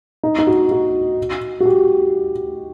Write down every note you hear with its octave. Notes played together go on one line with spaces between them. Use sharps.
D#4
D#4
F#4
F#4
F#4
G4